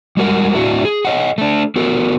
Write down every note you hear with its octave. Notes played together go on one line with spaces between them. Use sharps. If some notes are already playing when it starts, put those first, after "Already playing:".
G3 G#3 F#4 A#4 F#5
A2 D4 E4 F#4 E5
G#4
C#5 D#5 F#5
A3 D4
B3 F#4 A4 A#4